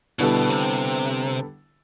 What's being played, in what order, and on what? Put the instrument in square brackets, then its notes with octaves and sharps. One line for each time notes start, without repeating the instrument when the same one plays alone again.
[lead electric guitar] B2 [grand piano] D3 G3 B3 E4 A4
[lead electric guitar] C3